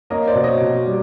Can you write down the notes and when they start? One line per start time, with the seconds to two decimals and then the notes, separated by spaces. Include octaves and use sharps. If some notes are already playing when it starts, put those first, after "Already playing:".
0.10 A#3 C#5 D#5
0.27 C5 D5
0.35 B2
0.44 C#5 D#5
0.61 B2
0.86 G3